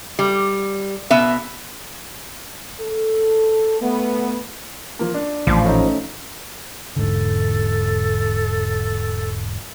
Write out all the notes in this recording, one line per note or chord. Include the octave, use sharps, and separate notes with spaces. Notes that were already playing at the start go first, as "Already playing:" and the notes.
G3
B2 B3 E5
A4
A3 B3
F3 A#3
D4
A1 A#2 F3
A3 C#4 D#4
E1 G#2 D3 A4